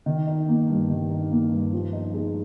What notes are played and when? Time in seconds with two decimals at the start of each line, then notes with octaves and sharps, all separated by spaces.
0.06 D#3
0.27 D#4
0.48 A#3
0.69 G2
0.90 D#3
1.10 D#4
1.31 A#3
1.51 G2
1.73 F3
1.93 D#4
2.14 G#3